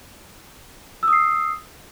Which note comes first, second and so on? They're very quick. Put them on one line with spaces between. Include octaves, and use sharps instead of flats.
E6 D#6 C7